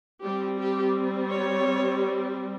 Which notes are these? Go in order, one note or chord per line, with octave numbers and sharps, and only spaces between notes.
G3 C4 G4
G4
C#5